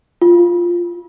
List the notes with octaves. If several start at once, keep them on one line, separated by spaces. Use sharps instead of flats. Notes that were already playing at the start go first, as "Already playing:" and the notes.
F4